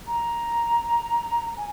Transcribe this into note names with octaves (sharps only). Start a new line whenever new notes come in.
A#5
G#5